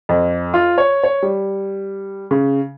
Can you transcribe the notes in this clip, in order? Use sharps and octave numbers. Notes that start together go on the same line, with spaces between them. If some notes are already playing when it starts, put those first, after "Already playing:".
F2
F4
C#5
C#5
G3
C#3